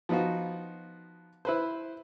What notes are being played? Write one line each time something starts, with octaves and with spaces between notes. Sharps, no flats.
F3 B3 D#4 F4 F#4
E4 B4 C5